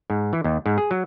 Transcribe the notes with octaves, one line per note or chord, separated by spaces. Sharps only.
G#2
E3
D#2
G#2
G#4
F#3